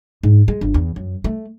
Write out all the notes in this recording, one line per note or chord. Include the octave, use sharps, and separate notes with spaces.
G#2
G#3
G1
E2
F#2
A3